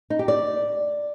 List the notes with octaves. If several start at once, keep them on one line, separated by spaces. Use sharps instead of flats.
D#4
G4
D5